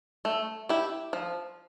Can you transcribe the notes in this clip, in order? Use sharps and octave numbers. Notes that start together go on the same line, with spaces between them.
A3
E4 G4
F3